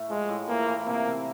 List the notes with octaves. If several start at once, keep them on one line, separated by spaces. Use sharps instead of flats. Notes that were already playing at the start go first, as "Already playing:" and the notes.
Already playing: A2 A3
F3 G#3
A2
E3 A#3
E3
C3 A#3
C3